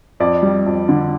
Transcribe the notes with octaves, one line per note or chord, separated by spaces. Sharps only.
F2 D5
G3
F2
D3